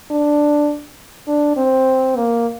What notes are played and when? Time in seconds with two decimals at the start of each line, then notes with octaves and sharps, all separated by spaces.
0.11 D4
1.28 D4
1.56 C4
2.16 A#3